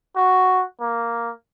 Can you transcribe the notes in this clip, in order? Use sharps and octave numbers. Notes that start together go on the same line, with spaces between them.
F#4
A#3